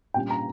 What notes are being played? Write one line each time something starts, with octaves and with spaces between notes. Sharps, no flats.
A#2 G3 C#4 G5
A#5